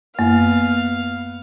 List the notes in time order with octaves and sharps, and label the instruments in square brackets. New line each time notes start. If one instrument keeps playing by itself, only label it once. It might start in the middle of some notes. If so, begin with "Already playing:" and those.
[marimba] F#2 A#3 [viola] B3 F5